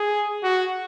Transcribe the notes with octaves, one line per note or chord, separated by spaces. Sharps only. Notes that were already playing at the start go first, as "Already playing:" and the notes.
Already playing: G#4
F#4